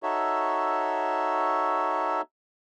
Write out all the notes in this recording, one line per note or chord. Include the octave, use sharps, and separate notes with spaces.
D#4 F#4 A4 C#5 E5